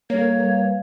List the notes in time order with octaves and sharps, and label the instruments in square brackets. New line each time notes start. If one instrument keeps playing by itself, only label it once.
[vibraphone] G3 A4 [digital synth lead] A#3 [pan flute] C#5
[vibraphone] G3 B4 F5